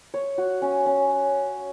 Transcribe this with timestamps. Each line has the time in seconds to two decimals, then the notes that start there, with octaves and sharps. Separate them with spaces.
0.14 C#5
0.38 F#4
0.62 C#4
0.86 C#4